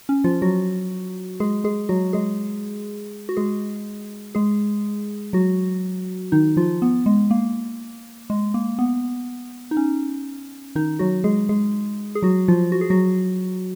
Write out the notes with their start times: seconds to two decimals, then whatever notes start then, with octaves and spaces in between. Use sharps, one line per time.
0.09 C#4
0.24 F3 F4
0.42 F#3 F#4
1.40 G#3 G#4
1.64 G#3 G#4
1.89 F#3 F#4
2.13 G#3 G#4
3.29 F#4
3.37 G#3 G#4
4.35 G#3 G#4
5.33 F#3 F#4
6.32 D#3 D#4
6.57 F3 F4
6.82 B3
7.06 G#3
7.31 A#3
8.30 G#3
8.54 A#3
8.79 B3
9.71 D#4
9.77 C#4
10.75 D#3 D#4
10.99 F#3 F#4
11.24 G#3 G#4
11.49 G#3 G#4
12.15 G#4
12.22 F#3 F#4
12.48 F3 F4
12.72 F#4
12.81 G#4
12.90 F#3 F#4